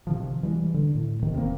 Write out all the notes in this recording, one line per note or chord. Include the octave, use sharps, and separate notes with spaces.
C3 D#3 F3
E3 G3 G#3
D3
A2
D2 C3 D#3
E1 A#3 C4